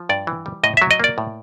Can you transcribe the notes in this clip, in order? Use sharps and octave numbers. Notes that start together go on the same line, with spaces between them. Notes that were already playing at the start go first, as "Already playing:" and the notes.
Already playing: F3
G2 D5
E3
G3
A2 D#5
F#3 E5
D#5
A#3 D5
A2